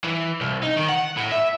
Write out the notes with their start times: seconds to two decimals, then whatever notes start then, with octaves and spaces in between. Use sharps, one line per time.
0.04 E3
0.41 C2
0.63 D#4
0.76 D#3
0.89 F#5
1.17 A2
1.32 E5